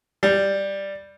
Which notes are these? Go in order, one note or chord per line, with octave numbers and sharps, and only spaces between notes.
G3